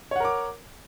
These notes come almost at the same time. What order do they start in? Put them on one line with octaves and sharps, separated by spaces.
C#5 F#5 A#4 D6